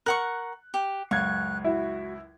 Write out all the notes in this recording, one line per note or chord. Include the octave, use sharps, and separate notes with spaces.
A#4 F#5 C#6 F#6
G4
C#2 F#2 F5 C#6 F#6 G#6
E4 F#4 E5